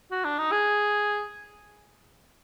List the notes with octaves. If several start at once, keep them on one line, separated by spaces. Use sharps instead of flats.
F#4
D4
D#4
G#4